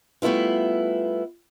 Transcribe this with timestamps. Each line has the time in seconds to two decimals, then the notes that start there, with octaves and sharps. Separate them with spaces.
0.22 G3 A3 B3 E4 F4